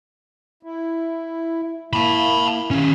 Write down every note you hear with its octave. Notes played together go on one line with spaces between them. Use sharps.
E4
A#3 E4 A5 B5
D#3 C#4